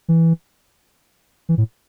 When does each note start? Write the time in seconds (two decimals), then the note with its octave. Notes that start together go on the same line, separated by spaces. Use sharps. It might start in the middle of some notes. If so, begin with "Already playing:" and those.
0.08 E3
1.49 E3
1.58 A2